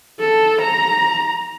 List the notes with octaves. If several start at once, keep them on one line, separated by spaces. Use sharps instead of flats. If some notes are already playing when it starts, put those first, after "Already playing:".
A4
A#5